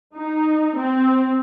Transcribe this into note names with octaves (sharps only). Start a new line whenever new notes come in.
D#4
C4